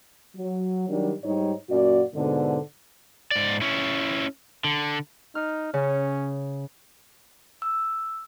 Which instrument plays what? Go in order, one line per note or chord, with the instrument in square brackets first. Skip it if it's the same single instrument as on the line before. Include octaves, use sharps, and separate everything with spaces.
[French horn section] F#3
D#3 F#3 G3 D4
G#2 G3 D#4 C#5
F#2 A#2 F#4 D5
G#2 B2 D3
[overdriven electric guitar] G#2 D5
C#4 E4
D3
[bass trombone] D#4 [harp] F6
[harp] C#3 [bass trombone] C#4
[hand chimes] E6